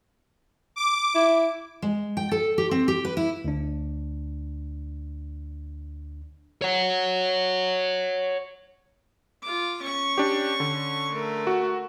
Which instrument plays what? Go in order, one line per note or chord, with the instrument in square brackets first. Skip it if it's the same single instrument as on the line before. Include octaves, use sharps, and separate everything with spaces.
[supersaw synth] D6
[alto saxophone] E4
[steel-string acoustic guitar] G#3
G5
A4
G4
C4
G4
B4
E4
[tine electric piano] D2 D4
[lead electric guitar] C#5 F#5
[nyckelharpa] F4 D6
C#4 C#6
[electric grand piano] D4 G4
D3
[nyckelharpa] A3 A#4
[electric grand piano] F#4